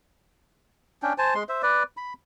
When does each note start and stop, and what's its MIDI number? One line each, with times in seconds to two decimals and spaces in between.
1.03 1.13 61
1.03 1.13 62
1.03 1.13 79
1.18 1.34 72
1.18 1.34 80
1.18 1.34 81
1.35 1.43 56
1.35 1.43 84
1.49 1.62 72
1.49 1.62 76
1.63 1.83 71
1.63 1.83 74
1.97 2.13 83